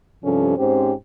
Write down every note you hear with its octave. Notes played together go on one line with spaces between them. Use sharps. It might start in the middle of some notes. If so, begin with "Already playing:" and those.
G2 C3 F3 C#4 A4
G#2 C4 C#4 G4 C5